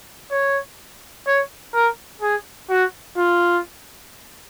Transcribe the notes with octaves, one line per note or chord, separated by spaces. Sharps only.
C#5
C#5
A#4
G#4
F#4
F4